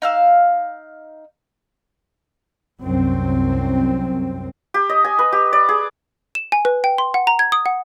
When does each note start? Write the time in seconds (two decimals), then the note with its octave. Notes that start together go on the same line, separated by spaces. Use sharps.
0.02 D#4 F5 E6
2.82 C2 F#2 C4
4.74 G4
4.89 D#5
5.04 G#5
5.19 B4
5.32 G4
5.53 D5
5.69 G#4
6.35 E7
6.52 G#5
6.65 B4
6.84 G5
6.98 C6
7.14 F#5
7.27 A#5
7.39 G#6
7.52 D#6
7.66 F#5